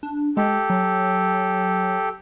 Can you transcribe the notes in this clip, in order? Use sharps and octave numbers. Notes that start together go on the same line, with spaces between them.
D4
G#3 G4 A4
F#3